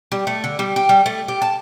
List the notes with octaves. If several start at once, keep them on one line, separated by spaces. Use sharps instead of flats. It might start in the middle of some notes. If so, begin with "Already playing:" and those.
G3
A3
D3
G3
G4
G3
A3
G4
A5